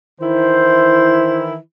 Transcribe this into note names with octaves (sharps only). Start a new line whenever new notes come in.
D#3 E3 E4 C5